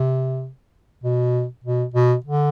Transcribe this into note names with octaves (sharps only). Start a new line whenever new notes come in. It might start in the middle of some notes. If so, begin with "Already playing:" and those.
Already playing: C3
B2
B2
B2
D3